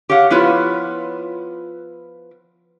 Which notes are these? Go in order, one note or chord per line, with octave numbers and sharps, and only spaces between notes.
G4 C#5 F5 F#5
F3 B3 E4 F4 B4 C#5